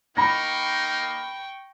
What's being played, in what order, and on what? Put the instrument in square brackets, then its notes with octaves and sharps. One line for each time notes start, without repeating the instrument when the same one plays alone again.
[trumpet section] A#3 D#4 [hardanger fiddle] G5 C#6 [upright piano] B5 A#6